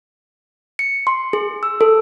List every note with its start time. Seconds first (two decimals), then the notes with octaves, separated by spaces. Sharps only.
0.79 C#7
1.07 C6
1.33 G#4
1.63 E6
1.81 A4